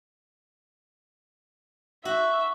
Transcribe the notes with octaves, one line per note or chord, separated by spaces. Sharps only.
F#4 E5